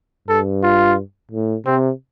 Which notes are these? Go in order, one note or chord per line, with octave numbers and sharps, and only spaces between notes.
G2 A4
F4
A2
C3 C4